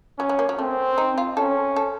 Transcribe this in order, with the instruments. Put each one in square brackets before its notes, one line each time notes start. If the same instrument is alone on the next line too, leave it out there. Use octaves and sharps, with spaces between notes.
[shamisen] F#3 [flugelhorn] C#4
[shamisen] F#3
A#3
F#3
[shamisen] A3 [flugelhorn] C4
[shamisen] D#4
F4
[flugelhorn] C#4 [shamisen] A4
[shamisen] A4